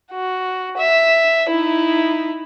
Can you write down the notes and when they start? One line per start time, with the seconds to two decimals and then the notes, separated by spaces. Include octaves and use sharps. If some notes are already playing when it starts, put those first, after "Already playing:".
0.12 F#4
0.78 E5
1.49 D#4 E4